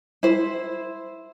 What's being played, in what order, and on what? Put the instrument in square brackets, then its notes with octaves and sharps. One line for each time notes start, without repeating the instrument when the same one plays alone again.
[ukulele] E4 C5